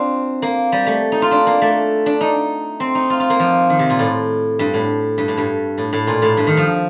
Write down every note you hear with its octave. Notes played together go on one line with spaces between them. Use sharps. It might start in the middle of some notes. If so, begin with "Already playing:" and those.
Already playing: C4 D4 F4
A#3
G3
A3
D#4
F4
D4
A#3
A3
D4
D#4
C4
D#4
F4
F4
A#3
F3
D#3
C3
A#2
A2
G2
A2
G2
A2
G2
A2
A2
A#2
A2
G2
D#3
F3